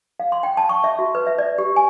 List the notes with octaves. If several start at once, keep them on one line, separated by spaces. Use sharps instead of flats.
F5
C6
G5
A5
C#6
E5
F#4
B4
E5
D5
G4
G#5